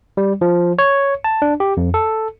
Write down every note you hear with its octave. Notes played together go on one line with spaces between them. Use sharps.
G3
F3
C#5
A5
D4
G4
F2
A4